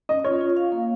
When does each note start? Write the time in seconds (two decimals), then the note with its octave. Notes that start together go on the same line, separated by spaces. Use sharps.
0.09 C#4 D#5
0.24 F4 C#5
0.41 F4
0.57 F5
0.72 A#3